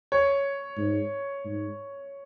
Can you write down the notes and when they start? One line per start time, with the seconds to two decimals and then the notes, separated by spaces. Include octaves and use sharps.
0.12 C#5
0.78 G#2
1.45 G#2